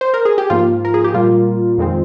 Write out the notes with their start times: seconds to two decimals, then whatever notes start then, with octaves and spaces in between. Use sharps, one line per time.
0.01 C5
0.14 A#4
0.25 G#4
0.38 G4
0.50 G#2 F3 A#3 F4
0.85 A#4
0.94 G#4
1.04 G4
1.14 A#2 G3 A#3 F4
1.78 F2 D#3 G#3 C4